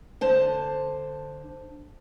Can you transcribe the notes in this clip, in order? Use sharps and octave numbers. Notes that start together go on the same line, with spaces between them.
D3 C5 A5